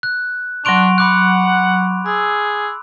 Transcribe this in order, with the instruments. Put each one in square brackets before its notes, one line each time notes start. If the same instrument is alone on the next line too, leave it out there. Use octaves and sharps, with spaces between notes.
[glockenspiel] F#6
[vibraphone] F#3 C#6 [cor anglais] D4 [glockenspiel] C6 D7 F7
[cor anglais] F#5 [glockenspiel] B5 D6 F#6
[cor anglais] G#4 [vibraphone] E6